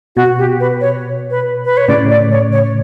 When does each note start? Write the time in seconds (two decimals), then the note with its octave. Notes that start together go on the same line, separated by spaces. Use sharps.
0.16 B2 F#4
0.38 G4
0.60 B4
0.81 C#5
1.31 B4
1.65 B4
1.77 C#5
1.88 A2 C#3 D5
2.10 D5
2.31 C#5
2.52 C#5